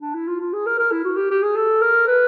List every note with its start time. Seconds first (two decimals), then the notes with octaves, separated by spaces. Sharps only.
0.02 D4
0.15 E4
0.28 F4
0.40 F4
0.53 G#4
0.66 A#4
0.79 A#4
0.92 E4
1.05 F#4
1.17 G4
1.30 G4
1.43 G#4
1.56 A4
1.81 A#4
2.08 B4